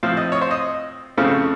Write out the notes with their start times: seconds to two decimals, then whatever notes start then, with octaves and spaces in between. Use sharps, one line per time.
0.03 A2 F3 C4 F5
0.17 D#5
0.32 C#5
0.42 C5
0.51 D#5
1.17 F2 C#3 A3 C4 F5